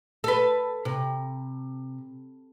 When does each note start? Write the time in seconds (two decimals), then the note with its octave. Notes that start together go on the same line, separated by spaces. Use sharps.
0.24 A4 B4
0.85 C3